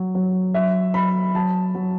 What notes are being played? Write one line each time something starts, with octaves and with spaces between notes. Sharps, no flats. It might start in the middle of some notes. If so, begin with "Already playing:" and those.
Already playing: F#3
F#3
F#3 E5
F#3 B5
F#3 A5
F#3